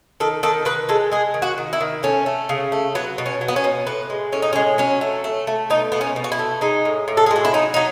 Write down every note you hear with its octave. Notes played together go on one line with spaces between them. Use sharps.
D#3 A4
D#3 A4
D#3 B4
G#3 A4
G#3 G#4
D#3
F#4
D#3
E4
D#3
A3 C#4
A3
C#3
A3
F#3 B3
B2
C#4
F#3
B3
C#4
B2
A2 B3
G#3
A2 C#4
D#4
C#4
G#3
F#3 C#4
A3
A3
A3
B2 D#4
B2 B3
C#4
B2
F#4
E4
A3
G#3 D#4
A2
A2
A4
G#4
G#3
F#4
E4
F#3 D#4
F#3 D#4